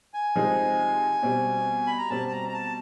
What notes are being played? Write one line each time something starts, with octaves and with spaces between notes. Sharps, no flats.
G#5
C3 F3 G#3 C4 D#4
B2 G3 C4
B5
A#5
B2 G3 C4 A5
A5
A#5
A#5
A5